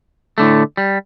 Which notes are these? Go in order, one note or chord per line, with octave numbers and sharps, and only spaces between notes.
A2 D3 A3
G3